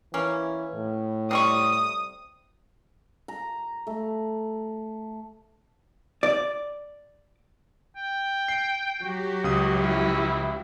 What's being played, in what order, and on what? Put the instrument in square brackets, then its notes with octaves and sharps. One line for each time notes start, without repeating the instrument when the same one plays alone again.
[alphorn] E3 [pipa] A#3 C#4
[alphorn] A2
[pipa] C3 G3 C#6 [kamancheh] D#6
[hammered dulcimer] A#5
A3
[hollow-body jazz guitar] D5
[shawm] G5
[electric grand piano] C7
[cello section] F#3 F#4 G4
[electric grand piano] C#2 D#6
[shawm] C#4 [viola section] E4